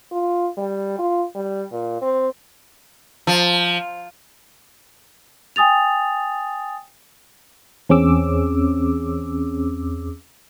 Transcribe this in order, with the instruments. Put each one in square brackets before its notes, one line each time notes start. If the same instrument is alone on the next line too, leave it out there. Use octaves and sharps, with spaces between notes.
[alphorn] F4
G3
F4
G3
A#2
C4
[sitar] F3
[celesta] G5 G#5 D#6 A6 F7
[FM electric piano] E2 C4 C#4 G#4 D6 E6